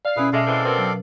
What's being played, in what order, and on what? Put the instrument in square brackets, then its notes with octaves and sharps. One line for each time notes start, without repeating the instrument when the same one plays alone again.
[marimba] D5 [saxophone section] F5
[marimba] B2 C#4 [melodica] E4 G#4 B4
[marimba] B2 E5 [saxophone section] G#3 [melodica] A4 D5 F5
[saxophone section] E3 G#3 C4
[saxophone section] B2 C4 [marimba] A#4 B4
[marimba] F#3